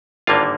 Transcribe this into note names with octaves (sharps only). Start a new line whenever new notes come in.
G#1 G2 D3 G3 A#3 F4